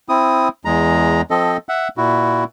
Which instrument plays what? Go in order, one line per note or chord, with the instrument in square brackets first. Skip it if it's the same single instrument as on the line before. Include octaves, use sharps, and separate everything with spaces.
[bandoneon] C4 E4 D#6
E2 G#3 A#5
F3 C4 A4 D#5
E5 F#5
A#2 E4 F#4